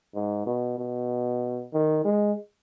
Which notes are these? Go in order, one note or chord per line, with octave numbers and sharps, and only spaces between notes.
G#2
B2
B2
D#3
G#3